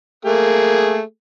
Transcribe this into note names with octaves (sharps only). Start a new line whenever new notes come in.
A3 A#3 G#4